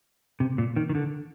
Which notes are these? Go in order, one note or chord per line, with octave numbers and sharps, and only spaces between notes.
C3
A#2
D#3
D#3
D3